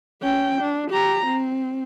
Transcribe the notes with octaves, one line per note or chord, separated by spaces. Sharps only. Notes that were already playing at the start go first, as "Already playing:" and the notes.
C#4 G5
D4
G4 A#5
C4